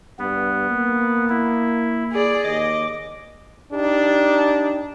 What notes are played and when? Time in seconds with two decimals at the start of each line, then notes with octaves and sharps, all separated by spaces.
0.19 G2 B3
0.70 A#3
1.29 E4
2.12 G#4 D5
2.45 D#2 D#5 D6
3.72 D4 D#4 G4